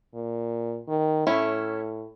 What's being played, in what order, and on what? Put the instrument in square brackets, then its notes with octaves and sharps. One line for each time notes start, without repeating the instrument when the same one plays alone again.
[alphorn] A#2
D#3
[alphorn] A2 [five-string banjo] A3 C#4 E4